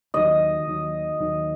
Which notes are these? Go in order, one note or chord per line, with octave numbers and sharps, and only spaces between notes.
D#2 D#3 F#3 D#5
D#2 D#3 F#3
D#2 D#3 F#3